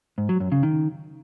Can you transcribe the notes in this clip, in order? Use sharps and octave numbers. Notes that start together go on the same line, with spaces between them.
G#2
F#3
F#2
C#3
D#3